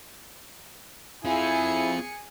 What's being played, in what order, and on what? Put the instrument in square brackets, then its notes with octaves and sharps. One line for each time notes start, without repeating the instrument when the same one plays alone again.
[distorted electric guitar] C4 F4 [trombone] E4 [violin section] G#4 G#5 C#7